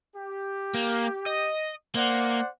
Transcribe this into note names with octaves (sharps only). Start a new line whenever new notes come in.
G4
A#3
D#5
A#3 C5 D5 F#5